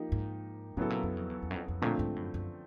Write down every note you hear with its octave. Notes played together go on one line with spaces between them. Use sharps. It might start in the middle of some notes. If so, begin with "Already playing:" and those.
Already playing: F3 A#3 D#4 G4
G#2
A2 C#3 F#3 B3 E4 A4
A#2
F#2
F2
E2
E2
F#2
F2
F2
A#2 D3 F3 A3 C4
G#2
F#2
F#2